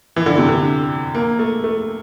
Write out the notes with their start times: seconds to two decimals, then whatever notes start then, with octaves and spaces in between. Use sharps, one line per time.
0.16 E3
0.26 D3
0.38 C3
0.48 D3
1.15 A#3
1.39 A3
1.64 A3